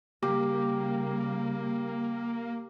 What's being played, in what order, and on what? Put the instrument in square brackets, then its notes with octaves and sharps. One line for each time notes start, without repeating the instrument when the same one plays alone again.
[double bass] C#3 G3 [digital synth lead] A#3 [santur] G4